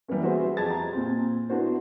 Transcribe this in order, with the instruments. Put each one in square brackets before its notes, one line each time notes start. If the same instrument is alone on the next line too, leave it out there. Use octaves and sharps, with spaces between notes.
[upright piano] E3 G3 A#3 B3 C#4
F#4 G#4 B4 C5 E5
F2 G4 G#4 A5 G#6 A6
A#5
A#2 C4
B3 D4 E4 F#4 C5